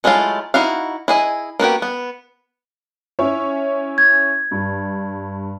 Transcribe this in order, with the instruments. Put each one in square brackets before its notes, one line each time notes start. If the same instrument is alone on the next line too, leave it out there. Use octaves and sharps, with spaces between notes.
[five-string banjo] F#3 G#3 A3 E4 F4
D#4 E4 F#4 F5
E4 G#4 D#5
A#3 B3 F#4 G4
B3
[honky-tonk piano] C#4 E4 C#5
[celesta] G#6
[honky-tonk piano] G2